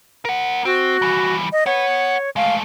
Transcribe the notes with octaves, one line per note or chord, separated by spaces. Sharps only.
A#4 F#5
C4 F#4
E3 G3
D#5
B4 C#5 F#5
G#3 A3 F5